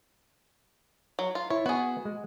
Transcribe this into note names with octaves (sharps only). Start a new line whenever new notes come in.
F#3
F4
E4 C#5
B3 F#4 G#4
G#3